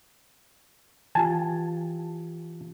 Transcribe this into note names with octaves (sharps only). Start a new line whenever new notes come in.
E3 F4 G4 G#5 A5